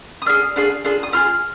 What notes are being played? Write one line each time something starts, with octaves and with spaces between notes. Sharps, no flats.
D#6
D4 F4 G#4 F6
D4 F4 G#4
D4 F4 G#4
D#6
D4 F4 G#4 F6